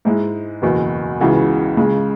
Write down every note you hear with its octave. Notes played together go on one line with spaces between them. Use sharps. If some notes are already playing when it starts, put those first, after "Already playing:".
G#2 G#3 E4
F#1 E2 B2
C#2 C#3 E3 B3 F#4
C#2 C#3 G#3